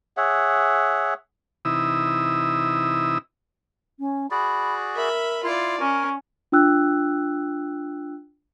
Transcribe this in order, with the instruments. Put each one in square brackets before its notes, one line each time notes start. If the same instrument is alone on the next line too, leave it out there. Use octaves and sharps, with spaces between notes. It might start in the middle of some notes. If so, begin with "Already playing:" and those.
[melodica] G#4 C#5 E5 F#5
[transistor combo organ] C3 E3 D#4 E4 D#6 E6
[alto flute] C#4
[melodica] F#4 G#4 D5 [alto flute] B5
[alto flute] A#4 [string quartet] E5 B5
[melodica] E4 C6 [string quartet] F4 D5
[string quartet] C#4 [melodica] A#4 G#5 [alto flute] C#6
[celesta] D4 F4 G5 E6 F#6